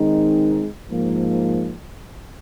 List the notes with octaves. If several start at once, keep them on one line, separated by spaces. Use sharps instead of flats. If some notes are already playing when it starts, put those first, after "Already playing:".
Already playing: D#3 G#3 C4 D#4
G#2 F3 A#3